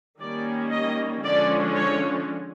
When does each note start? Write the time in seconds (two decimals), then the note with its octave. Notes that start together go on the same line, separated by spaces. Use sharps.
0.20 D#3 G3 A#3 C#4 D5
0.71 D#5
1.23 D3 F3 G#3 C#4 D5
1.75 C#5